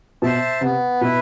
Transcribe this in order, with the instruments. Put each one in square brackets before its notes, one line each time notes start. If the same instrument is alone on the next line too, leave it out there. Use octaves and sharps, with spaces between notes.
[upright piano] B2 [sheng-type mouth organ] C5 E5 A5
[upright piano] C3 [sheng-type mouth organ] B3
[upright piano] B2 [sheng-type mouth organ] E4 B4